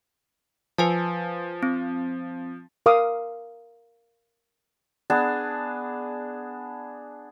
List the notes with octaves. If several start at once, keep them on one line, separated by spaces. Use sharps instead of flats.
F3 B4 G#5 A5
C4
A#4 F5 D6 D#6
B3 D4 G#4 A5